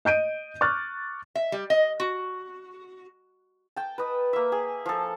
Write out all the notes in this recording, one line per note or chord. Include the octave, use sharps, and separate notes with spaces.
D#5 G6 D7 D#7
C#6 D6 F6 F#6 A6
E5
G3
D#5
F#4
G5 A5
B4 D#5
A#3 E5
G#4
F3 A4